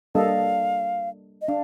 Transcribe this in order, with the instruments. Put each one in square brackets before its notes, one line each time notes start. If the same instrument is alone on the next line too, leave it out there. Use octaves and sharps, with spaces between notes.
[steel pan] G3 A#3 D4 A4 D#5 [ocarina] F5
[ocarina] D#5
[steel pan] D4 [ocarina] F5